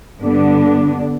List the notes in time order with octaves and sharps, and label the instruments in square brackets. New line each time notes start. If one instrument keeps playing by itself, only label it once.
[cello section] G2 D3 B3 D4